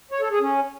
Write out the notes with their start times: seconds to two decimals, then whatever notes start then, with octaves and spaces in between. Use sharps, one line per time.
0.11 C#5
0.21 A4
0.31 G#4
0.41 C#4